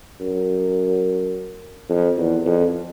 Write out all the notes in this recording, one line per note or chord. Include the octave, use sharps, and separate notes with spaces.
F#2
F2
E2
F2